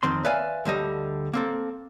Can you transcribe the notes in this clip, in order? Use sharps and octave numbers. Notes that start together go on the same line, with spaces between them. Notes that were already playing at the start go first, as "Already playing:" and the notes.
F2 D#3 C4 C6
B4 D5 E5 F5 G#5
D2 D3 G3 D#5
A#3 C4 A4